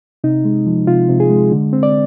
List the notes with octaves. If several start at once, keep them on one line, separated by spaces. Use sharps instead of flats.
C3 D#4
G#3
F3
C3 F4
C3
G#4
G#3
D3
C4
D5